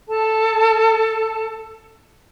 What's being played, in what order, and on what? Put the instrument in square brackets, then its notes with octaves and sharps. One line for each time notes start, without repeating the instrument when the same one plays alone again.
[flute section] A4 A5